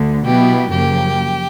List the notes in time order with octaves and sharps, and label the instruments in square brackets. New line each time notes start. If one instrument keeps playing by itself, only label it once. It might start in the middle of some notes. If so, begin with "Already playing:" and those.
Already playing: [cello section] D2 D3
[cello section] B2 F#3 B3 E4 [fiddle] G4
[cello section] F#2 C#3 F3 A#3 [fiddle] G4